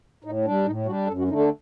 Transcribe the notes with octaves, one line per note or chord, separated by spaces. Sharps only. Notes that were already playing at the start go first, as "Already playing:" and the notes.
A2 D#4
G3 D4
A2 D#4
G3 D4 F#4
F#2 A4
F#4
D3 A3 D4 D#4
A4